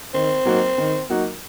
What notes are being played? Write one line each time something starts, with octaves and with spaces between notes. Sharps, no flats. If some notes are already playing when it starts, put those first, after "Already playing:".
D#3 C4
F#3 A#3 D#4 F#4
D#3
F#3 A#3 D#4 F#4